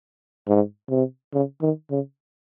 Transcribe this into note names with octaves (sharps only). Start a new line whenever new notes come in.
G#2
C3
C#3
D#3
C#3